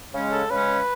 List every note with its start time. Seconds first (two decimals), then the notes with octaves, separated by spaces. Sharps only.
0.13 C#3 G#3 C#4
0.32 A4
0.50 C#3 G#3 C#4 B4